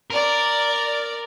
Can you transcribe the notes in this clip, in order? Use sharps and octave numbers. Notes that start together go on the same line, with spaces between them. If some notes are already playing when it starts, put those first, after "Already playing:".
A#4 D5